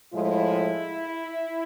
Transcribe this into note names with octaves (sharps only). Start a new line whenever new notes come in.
A2 F3 G#3 E4